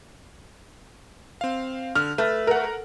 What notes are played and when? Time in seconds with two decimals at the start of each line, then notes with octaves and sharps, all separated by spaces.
1.41 C4 F5
1.95 D3 F6
2.18 A3 B4
2.47 A#4 F#5